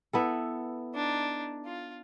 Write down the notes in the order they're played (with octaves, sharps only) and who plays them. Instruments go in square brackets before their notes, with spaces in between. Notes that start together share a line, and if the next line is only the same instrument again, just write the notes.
[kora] B3 E4 A4
[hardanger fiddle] D4 D#4
F4